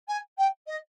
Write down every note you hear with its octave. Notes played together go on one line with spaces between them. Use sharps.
G#5
G5
D#5